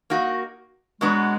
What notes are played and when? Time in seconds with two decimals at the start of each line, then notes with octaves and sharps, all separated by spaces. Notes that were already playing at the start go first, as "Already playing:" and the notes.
0.10 A#3 D#4 F#4
1.01 B2 F#3 G#3 B3 D4 F#4